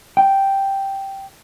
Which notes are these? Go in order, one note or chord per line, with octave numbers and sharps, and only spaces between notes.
G5